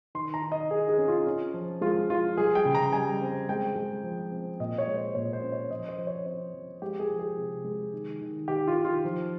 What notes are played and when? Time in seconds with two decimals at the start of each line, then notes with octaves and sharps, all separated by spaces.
0.15 D#3 C6
0.34 A#5
0.42 D#3
0.52 D#5
0.70 D#3 G#4
0.89 G#4
0.98 C#4
1.08 F4
1.27 C#4
1.54 F3
1.81 G#3 F4
2.09 F3 F4
2.37 G3 G#4
2.55 G5
2.65 C#3
2.75 A#5
2.93 G3 G#5
3.21 C4
3.49 G#3 G5
3.76 G#3
4.03 F3
4.31 C4
4.59 A#2 D#5
4.78 C#5
4.87 G#3
4.96 C5
5.15 A#2 C#5
5.33 C5
5.43 C#4
5.52 C#5
5.71 F3 D#5
5.89 C5
5.98 F3
6.07 C#5
6.26 C4 C5
6.54 F3
6.82 G#3 G4
7.00 G#4
7.09 F3
7.19 G#4
7.37 C3
7.64 G#3
7.93 D#3
8.21 D#3
8.48 D#3 G4
8.67 F4
8.77 D#3
8.85 F4
9.04 F3